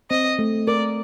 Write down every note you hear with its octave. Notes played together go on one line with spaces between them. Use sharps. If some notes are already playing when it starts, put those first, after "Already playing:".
C4 D#5
A3
A#4 D5